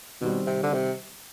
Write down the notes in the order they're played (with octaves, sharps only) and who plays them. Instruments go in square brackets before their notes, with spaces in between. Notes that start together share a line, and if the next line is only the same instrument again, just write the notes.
[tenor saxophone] B2 [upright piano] D#3 G3 C4
[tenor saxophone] C3
D3
C3